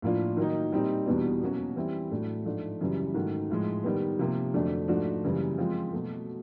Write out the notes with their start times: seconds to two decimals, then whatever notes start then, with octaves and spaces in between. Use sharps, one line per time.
0.02 A2 F3 A#3 D4 F4
0.37 D#3 F#3 A#3 D#4
0.72 A#2 G3 C4 D#4
1.06 E2 B2 G3 B3 D4
1.42 B2 F#3 A#3 C#4 F#4
1.76 E3 G3 C4 E4
2.11 A2 F#3 A3 D4
2.45 G#2 F3 A3 D4
2.81 F#2 C#3 E3 G3
3.14 G#2 D#3 F#3 A3
3.50 A2 F3 G#3
3.84 D#3 G3 B3
4.19 C3 F3 A#3
4.54 F2 D3 F#3 A3 D4
4.88 G#2 F3 A3 D4 F#4
5.24 F#2 C#3 E3 G3 A#3
5.58 F3 G#3 C4 F4
5.93 B2 F#3 A3